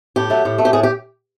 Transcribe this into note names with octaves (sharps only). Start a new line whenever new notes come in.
A2 G4
F#3 A3
A2
F#3 A3
G4
A2 G#4
G4